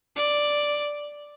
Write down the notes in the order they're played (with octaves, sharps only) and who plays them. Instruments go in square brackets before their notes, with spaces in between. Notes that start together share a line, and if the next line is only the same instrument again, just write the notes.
[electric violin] D5